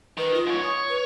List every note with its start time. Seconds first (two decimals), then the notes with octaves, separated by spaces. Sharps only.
0.18 D#3 B4
0.34 F4
0.47 G#2 C#5
0.63 C#5 D#6
0.89 B4